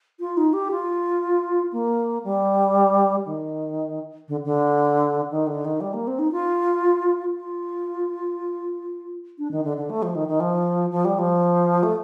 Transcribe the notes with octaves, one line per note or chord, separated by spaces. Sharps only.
F4
D#4
G4
F4
A#3
G3
D#3
D3
D3
D#3
D3
D#3
G3
A#3
C4
D#4
F4
F4
D4
D#3
D3
D3
A3
F3
D#3
D#3
F3
F3
G3
F3
A3